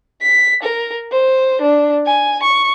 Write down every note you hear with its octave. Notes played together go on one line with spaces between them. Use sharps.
B6
A#4
C5
D4
G#5
C#6